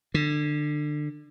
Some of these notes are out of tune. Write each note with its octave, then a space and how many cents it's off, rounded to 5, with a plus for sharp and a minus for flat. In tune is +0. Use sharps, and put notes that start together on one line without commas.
D3 +25